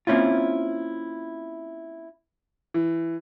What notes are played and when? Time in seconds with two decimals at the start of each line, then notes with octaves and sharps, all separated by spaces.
0.07 A#3 C4 C#4 E4 F4
2.74 E3